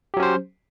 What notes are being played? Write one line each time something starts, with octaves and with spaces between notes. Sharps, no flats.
F#3 C#4 G4 C5